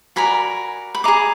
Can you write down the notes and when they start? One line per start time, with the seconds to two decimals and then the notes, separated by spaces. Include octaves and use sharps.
0.16 F#4 A#4 D5 G#5 B5
0.95 B5
1.04 G#4 D#5 A#5 D6